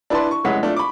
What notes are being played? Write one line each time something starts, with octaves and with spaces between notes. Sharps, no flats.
D4 E4 B4 D5 A5 C6
C#6
F1 G#3 C#4 E4 F#5 B6
A3 D4 F4
B5 C#6 D6